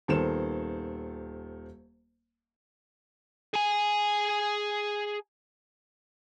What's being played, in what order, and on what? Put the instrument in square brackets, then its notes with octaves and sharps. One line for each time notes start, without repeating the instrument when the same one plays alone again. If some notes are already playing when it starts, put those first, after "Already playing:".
[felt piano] D#1 D#3 B3 A4 C5 E7
[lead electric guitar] G#4 G#5